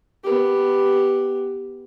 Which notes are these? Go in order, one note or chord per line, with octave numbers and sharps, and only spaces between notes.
B3 G4